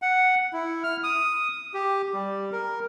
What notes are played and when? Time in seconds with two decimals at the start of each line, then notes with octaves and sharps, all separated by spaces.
0.02 F#5
0.53 E4
0.83 F6
1.03 D#6
1.74 G4
2.14 G3
2.52 A#4